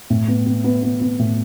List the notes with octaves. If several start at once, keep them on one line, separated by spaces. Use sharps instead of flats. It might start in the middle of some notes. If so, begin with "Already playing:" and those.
A2
B3
B3
B3
B3
B3
A2